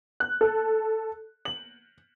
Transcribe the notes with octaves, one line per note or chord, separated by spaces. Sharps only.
F#6
A4
F#7